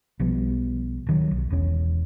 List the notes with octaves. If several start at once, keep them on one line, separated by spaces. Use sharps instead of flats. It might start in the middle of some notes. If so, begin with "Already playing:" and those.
B1 F3 G3 B3
D1 D#3 F#3
B1
E1 E2 C#4